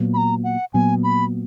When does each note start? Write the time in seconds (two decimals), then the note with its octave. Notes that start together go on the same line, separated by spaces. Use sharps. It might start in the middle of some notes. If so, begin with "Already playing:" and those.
Already playing: A#2 F#3 B3
0.14 B5
0.17 A#5
0.44 F#5
0.73 A#2 F#3 B3 G#5
1.03 B5